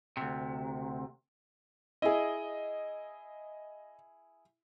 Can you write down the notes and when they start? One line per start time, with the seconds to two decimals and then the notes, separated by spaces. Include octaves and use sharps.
0.17 D2 C3
2.02 E4 G#4 D#5